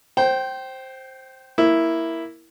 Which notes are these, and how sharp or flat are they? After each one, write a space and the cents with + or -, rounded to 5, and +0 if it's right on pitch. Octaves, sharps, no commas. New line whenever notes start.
C5 +10 G5 -20
A#3 +0 E4 +0